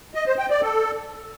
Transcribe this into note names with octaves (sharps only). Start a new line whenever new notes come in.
D#5
C5
G5
D5
A4